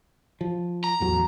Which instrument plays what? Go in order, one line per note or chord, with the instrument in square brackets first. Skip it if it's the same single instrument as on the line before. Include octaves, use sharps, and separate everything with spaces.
[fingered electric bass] F3
[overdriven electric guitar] A#5
[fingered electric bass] A1 E2 F#3